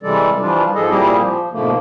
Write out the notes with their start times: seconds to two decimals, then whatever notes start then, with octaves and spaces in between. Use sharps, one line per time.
0.03 C3 E3 G3 G#3 A4 D5
0.40 E3 F3 G3 D4 F4
0.75 G#2 F3 G#4 A4 D#5
0.89 A#2 G3 C4 E4 G4 G#4
1.20 F3
1.52 G#2 B2 D3 F3 A3 A#3